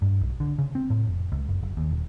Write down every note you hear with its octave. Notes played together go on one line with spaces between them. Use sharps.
G2
B1
D3
C#3
C4
A2
F1
C#2
F#1
F#1
D#2
D#1